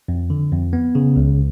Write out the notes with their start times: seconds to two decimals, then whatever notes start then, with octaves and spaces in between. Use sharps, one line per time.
0.08 F2
0.30 D3
0.52 F2
0.73 B3
0.95 C#3
1.16 C#2